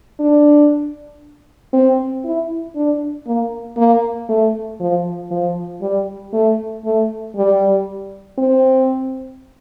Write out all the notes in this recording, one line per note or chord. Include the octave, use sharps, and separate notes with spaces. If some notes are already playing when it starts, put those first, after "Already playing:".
D4
C4
E4
D4
A#3
A#3
A3
F3
F3
G3
A3
A3
G3
C4